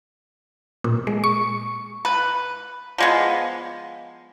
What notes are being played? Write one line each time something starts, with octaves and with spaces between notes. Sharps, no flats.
A#2
G#3
C#6
B4
F3 G#3 B3